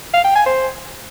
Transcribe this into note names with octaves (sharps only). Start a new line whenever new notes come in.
F5
G5
G#5
C5